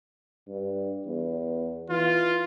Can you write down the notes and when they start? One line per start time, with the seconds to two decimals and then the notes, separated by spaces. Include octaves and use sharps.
0.48 G2
1.06 E2
1.90 E3 F4